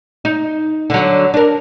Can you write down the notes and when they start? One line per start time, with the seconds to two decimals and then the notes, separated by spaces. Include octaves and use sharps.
0.25 D#4
0.90 D3 F#3
1.34 D4 A#4